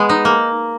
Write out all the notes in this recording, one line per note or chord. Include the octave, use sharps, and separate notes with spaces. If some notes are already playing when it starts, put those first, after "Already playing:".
Already playing: G#3 B3
D#4
A#3